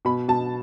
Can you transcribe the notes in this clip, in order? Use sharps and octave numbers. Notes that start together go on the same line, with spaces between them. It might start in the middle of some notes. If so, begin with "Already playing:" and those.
B2 B5
B2 A5